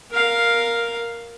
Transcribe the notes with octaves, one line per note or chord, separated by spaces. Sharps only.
A#4 F5